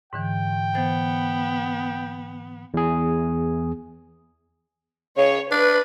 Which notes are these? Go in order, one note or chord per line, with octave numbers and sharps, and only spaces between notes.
G#2 D3 E3 G5
E3 B3 C5 A6
E2 G#4
C#3 C#5
D4 B4